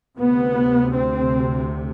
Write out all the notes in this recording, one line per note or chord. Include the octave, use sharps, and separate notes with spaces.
D2 C3 B3
C4